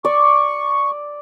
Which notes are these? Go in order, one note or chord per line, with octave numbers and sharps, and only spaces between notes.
D5 C#6